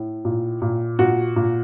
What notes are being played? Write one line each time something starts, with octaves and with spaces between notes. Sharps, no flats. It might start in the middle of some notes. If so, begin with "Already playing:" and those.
Already playing: A2
A#2
A#2
A#2 F#4
A#2